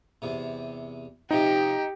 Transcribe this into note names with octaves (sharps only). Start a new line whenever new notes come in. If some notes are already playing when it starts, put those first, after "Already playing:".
E2 C3
C3 F3 D#4 G4